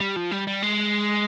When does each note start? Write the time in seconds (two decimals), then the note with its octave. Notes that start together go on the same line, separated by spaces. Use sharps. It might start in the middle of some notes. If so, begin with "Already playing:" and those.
0.01 G3
0.16 F3
0.31 G3
0.47 G3
0.62 G#3